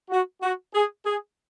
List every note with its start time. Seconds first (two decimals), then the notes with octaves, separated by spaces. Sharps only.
0.09 F#4
0.41 F#4
0.73 G#4
1.05 G#4